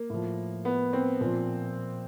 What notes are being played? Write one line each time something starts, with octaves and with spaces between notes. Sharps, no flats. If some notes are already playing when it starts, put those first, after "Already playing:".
Already playing: A#3
A2 F3
B3
C4
A#2 F3